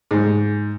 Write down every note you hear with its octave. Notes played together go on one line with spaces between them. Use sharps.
G#2